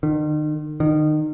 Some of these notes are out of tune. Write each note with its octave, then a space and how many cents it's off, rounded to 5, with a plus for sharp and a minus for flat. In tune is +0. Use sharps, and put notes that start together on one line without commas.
D#3 -40
D#3 -30